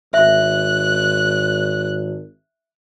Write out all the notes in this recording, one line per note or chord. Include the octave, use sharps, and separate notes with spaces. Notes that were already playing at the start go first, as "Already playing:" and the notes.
G#1 E5 F#6